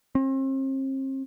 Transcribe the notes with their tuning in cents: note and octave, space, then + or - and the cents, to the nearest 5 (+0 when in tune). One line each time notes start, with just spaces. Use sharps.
C4 +40